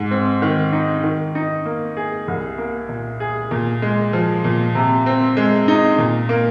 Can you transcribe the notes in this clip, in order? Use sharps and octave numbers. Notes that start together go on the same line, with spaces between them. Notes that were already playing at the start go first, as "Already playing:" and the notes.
Already playing: G#2
C4
D#3
D#4
D#3
D#4
A#3
G#4
C2
A#3
A#2
G#4
A#2
G#3
F3
A#2
C3
C4
G#3
D#4
A#2
A#3